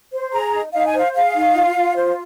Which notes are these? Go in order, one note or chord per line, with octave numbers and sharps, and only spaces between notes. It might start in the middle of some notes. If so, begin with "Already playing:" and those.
C5
G#4 A#5
D#4
D#4 F5
G#5
C5 F5
G#4 F5
D#4
F4
F4
C5